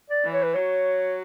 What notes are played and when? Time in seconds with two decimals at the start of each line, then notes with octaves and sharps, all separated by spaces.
0.10 D5
0.25 E3
0.33 C#5
0.43 B4
0.54 F#3 C#5